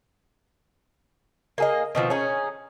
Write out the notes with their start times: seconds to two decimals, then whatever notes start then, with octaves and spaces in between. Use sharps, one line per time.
1.58 A#3 G#4 D#5
1.95 B2 D#3 F3 C4
2.10 C#4 D#4 G#4